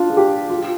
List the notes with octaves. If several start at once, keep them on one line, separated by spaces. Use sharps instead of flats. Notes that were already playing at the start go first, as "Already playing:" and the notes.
Already playing: D4 F4
G#4
G4
F4